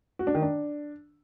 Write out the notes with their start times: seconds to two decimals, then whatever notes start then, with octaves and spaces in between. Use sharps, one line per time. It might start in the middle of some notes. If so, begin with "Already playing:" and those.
0.19 F#4
0.27 D4
0.35 D#3
0.42 D4